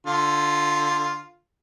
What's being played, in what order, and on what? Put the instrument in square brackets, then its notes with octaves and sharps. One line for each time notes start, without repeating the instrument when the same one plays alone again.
[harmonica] D3 F4